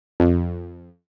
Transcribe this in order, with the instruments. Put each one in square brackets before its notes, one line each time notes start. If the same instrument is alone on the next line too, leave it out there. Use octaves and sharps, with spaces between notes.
[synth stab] F2